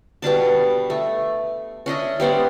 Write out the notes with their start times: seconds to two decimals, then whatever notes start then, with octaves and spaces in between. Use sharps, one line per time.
0.22 B2 G3 D4 A5
0.90 A3
1.86 C#4 D4 D#5 E5
2.20 G3 B3 C5 D5